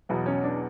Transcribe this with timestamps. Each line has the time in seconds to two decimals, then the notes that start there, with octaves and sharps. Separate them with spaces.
0.09 E2 B2 F#3 B3
0.26 C#4
0.43 D4